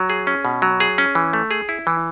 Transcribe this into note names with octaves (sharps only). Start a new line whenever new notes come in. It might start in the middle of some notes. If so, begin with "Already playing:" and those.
Already playing: F#3
G#4
C#4
B2
F#3
G#4
C#4
E3
A3
G#4
E4
E3